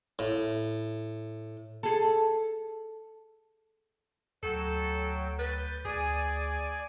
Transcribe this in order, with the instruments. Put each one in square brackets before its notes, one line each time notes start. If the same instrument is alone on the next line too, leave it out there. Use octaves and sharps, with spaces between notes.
[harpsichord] A2
[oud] G#4 A4
[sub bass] D2 [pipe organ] F#3 G5 [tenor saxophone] A4
[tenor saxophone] B4 [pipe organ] G6 A6
[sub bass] D2 [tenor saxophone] G#4 [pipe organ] D5 G#5